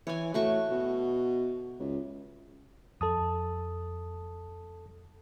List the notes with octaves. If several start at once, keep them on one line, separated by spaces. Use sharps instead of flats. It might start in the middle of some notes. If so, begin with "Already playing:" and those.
E3 C#5 G#5
A2 A3 F#4 C#6
B2
C#2
F2 A4 A5 D#6